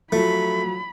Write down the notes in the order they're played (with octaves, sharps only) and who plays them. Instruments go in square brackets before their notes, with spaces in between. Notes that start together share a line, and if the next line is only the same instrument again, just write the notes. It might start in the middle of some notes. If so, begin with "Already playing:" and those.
[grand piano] F3 F#3 [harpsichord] A3 [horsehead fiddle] B5